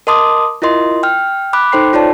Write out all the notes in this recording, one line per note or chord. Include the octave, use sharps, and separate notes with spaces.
A#4 D#5 A5 C6 D6 D#6
E4 F4 A#4 D#5 C6
G5 F6
B5 D6 F#6
D#4 A4 C5 G5 C6 C7
F4 C#5 D5 A5